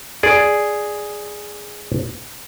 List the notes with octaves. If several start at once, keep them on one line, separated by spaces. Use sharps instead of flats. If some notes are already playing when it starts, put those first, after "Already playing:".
G#4 D5